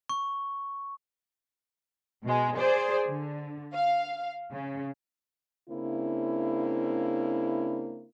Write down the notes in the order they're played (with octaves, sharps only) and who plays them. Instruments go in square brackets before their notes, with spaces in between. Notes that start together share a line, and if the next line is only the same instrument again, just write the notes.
[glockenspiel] C#6
[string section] B2 G#3
G#4 C5 D5
D3
F5
C#3
[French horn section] C#3 A#3 C4 D4 E4